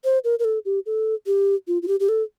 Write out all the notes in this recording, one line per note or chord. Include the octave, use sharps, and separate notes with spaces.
C5
A#4
A#4
A4
G4
A4
G4
F4
F4
G4
G4
A4